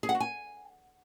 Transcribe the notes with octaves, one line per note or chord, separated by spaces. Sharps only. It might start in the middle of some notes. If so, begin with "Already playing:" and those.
G#4
F#5
F#4
G#5